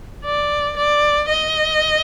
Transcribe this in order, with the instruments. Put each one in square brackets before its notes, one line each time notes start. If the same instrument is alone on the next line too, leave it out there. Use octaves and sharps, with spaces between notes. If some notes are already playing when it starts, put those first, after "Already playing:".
[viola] D5
D5
D#5